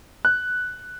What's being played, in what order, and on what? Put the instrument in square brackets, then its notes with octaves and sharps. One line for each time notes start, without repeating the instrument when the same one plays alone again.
[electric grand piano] F#6